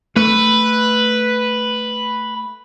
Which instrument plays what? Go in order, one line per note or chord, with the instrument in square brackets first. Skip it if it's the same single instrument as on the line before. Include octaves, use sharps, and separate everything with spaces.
[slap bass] A3 [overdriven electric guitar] B4